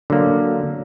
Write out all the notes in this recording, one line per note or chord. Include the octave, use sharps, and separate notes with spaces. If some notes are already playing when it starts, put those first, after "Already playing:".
D3 F#3 A#3